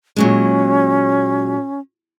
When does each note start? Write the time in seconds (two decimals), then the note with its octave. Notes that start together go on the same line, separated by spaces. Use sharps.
0.16 A#2 F#3 G#3 C#4